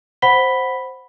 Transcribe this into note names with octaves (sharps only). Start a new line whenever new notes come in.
C5 F#5 B5 B6 G7